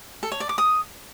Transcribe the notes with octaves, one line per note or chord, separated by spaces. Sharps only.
A4
C#5
D5
D6
D#6